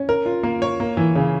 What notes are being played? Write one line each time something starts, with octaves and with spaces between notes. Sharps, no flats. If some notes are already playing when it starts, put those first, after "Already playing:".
Already playing: C#4
A#4
F4
A#3
C#5
A#3
E3
C#3